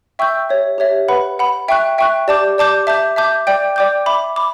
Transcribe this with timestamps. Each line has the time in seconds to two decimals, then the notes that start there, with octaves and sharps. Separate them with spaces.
0.19 E5 G5 C#6 E6 G6
0.49 G4 C#5 E5
0.78 G4 C#5 E5
1.08 B4 F#5 B5
1.38 B4 F#5 B5
1.68 E5 G5 C#6 F#6
1.98 E5 G5 C#6 F#6
2.28 G4 D5 A5 D6 G6
2.58 G4 D5 A5 D6 G6
2.87 E5 A5 D6 G6
3.16 E5 A5 D6 G6
3.47 D5 G5 D6 G6
3.76 D5 G5 D6 G6
4.06 E5 B5 D6
4.36 B5 D6